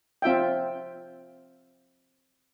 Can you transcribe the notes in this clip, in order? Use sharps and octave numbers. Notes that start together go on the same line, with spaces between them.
C4 F4 E5 G5